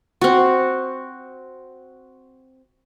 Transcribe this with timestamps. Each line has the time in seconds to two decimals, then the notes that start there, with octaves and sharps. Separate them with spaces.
0.21 C4 F#4